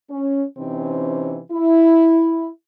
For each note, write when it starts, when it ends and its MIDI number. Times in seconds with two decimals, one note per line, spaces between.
0.10 0.45 61
0.58 1.40 48
0.58 1.40 52
0.58 1.40 60
0.58 1.40 61
0.58 1.40 63
1.52 2.48 64